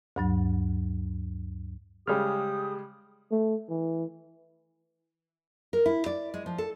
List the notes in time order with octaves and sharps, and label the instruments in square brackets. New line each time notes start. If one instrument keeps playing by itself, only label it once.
[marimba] D2 G2 F#3
[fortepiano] C#3 G3 G#3 [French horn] G4 [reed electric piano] G#4 F6 [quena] D#6
[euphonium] A3
E3
[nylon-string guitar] A#4
E4
D5
G#3
F3
A4